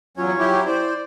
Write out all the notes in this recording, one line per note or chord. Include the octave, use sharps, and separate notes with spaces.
E2 F#3 C#4 F4 C#5
F#3 E4 G4
E4 C5 D5